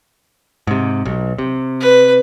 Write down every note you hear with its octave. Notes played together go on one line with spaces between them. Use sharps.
G#2 C3
B1
C3
B4